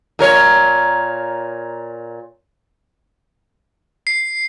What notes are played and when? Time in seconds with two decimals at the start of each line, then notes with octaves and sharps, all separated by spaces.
0.19 A#2 A#4 C#5
4.07 C7